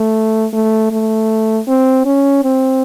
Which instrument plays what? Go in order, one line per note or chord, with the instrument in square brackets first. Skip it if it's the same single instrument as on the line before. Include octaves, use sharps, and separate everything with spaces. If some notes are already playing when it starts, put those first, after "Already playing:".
Already playing: [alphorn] A3
A3
A3
C4
C#4
C4